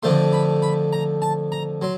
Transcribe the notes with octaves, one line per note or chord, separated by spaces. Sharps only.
F2 D3 F3 A3 C6
B5
B5
A#5
A5
A#5
F#3 C6